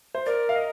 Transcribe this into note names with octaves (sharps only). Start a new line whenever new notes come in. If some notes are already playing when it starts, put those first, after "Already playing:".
C5
A#4 D5
F5
D#5